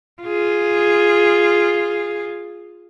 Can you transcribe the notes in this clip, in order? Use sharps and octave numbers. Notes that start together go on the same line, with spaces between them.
F4 G#4